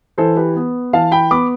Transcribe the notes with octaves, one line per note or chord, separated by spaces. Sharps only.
E3 A4 C5
G4 B4
B3
E3 F5 A5
G5 B5
B3 B5 D6